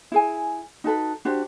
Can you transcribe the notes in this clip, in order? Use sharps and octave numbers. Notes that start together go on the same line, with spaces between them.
E4 G#4 G#5
D#4 F#4 A4 B4
D4 F#4 G4 C5